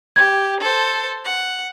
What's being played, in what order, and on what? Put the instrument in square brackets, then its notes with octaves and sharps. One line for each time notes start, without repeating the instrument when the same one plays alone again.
[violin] G4 [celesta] G#6
[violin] A4 C5
F#5